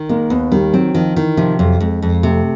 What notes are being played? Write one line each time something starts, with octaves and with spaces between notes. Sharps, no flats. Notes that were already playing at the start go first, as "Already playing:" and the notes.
Already playing: D#3
G#3 A#3
D#2 B3
D#3 G3
F#3 C4
D#3 F3
D#3 E3
C3 F3
F2 F#3
F2 G#3
F2
C3 A3